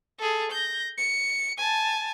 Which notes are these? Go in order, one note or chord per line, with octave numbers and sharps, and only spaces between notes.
G#4 A4
G6 A#6
C#7
G#5 A5